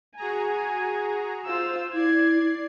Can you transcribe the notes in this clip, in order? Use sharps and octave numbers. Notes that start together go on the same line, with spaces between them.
F#4 G#4 G#5 A#5
F4 C5 E6
E4 D5 G#6 C7